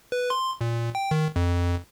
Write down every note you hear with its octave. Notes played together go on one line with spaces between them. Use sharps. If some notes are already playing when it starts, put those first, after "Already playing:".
B4
C6
A#2
G5
D#3
F2